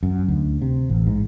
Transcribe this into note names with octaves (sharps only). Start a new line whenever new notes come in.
F#2
D2
C3
A1
G#2